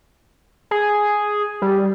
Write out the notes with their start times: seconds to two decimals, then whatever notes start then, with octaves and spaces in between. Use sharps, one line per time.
0.71 G#4
1.62 G3